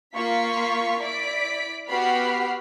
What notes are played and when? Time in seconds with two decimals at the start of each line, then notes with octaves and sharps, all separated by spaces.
0.15 A#3 F4 C#6 B6 C7
1.00 E4 D5 B6 D7
1.89 B3 F#4 G4 B5 F6 C7